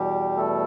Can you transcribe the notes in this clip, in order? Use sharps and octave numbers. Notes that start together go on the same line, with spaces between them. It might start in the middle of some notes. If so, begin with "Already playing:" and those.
Already playing: E2 B2 G3 G4
A3 A4